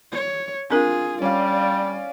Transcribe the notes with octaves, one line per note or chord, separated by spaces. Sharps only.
C#5
C4 D4 F4 G#4 A#4
G3 C#4 D5 F5